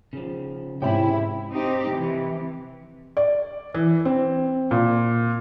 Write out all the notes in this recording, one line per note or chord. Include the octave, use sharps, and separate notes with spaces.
C#3 F3
G#2 C3 C#4 E4 G5 B5
C4 D#4 G4
C3 E3
D5
E3
C4
A#2